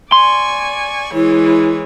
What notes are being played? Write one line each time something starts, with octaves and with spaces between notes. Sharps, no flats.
D5 G#5 C6 C#6
E3 G#3 E4 C#5